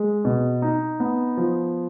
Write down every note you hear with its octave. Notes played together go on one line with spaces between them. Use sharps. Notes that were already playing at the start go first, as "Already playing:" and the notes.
Already playing: G#3
B2
D#4
B3
F3